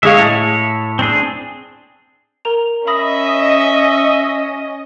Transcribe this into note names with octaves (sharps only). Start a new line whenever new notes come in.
G#3 G#4 C#5 E5 F5
A2
C4 D4 G#4
A#4 A#5 F7
C#4 D#5 E5 B5 D#6 A#6